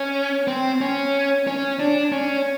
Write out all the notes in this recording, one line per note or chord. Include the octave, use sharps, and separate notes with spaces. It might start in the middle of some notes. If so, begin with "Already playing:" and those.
Already playing: C#4
C4
C#4
C#4
D4
C#4